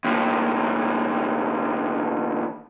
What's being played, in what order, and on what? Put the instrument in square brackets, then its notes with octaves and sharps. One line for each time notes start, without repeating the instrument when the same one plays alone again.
[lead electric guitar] D#2 A2